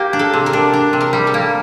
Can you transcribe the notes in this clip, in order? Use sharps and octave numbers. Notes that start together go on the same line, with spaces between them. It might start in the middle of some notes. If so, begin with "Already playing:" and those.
Already playing: A#3 G4
D4
A4
C3
A#4
D4
D4
C3
A#4
G3
A4
A#3